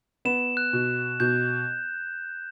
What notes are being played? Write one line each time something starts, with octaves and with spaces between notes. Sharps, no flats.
B3 E7
F#6
B2
B2 G6